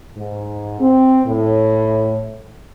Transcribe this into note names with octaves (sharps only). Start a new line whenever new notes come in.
G#2
C4
A2